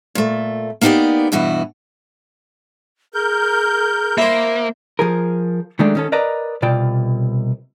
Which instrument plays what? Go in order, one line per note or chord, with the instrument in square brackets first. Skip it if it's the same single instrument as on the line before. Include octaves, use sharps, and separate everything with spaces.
[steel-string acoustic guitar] A#2 A3
A#3 B3 D#4 E4 G4 D5
G2 B2 E3 F#4
[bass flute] G#4 [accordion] A#4 G6
[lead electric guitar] A#3 [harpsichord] E4 C5
[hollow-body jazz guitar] F3 G#4 A#4
D#3 F#3 G#3 A3 D4
D#3 C#4 A4
A#4 B4 D5 D#5 A5 A#5
C2 B2 F4 D5 G5 A5